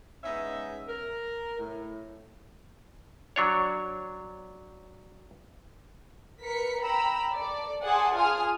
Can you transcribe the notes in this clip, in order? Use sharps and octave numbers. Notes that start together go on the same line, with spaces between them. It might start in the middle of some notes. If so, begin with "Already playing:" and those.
G#3 B3 C#4 D#4 E5
A#4
A2
F#3 D4 C#5
A#4 B4 B6 C#7
G5 A#5 B5 E6
A4 D5
G#4 D5 F#5 A5 C6
F4 G#4 G#5 D#6 F6